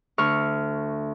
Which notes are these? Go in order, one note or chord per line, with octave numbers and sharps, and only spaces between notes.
D2 C#6 F6